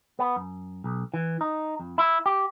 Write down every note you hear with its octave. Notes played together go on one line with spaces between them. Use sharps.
B3
F#2
B1
E3
D#4
F2
E4
G4